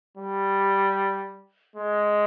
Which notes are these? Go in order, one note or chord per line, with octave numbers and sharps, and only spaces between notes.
G3
G#3